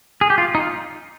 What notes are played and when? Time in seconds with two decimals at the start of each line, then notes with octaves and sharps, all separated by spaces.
0.21 G#4
0.30 G4
0.38 F4
0.55 D#4
0.60 F4